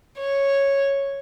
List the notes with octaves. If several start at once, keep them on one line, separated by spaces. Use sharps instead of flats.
C#5